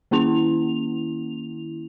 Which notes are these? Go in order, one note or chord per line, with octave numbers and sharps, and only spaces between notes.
D#3 A#3 C#4 E4 F7